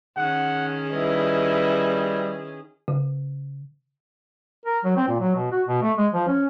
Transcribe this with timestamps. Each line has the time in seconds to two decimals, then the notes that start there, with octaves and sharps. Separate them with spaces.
0.17 D#3 C#4 G#4 F#5
0.93 G3 E4 B4 D#5
2.88 C#3
4.66 A#4
4.85 F#3
4.97 C4
5.08 A#2
5.20 F#3
5.36 B2
5.52 F#4
5.68 B2
5.83 A3
5.98 G#3
6.13 F3
6.28 C#4